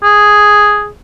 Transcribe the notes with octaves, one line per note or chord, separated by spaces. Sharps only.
G#4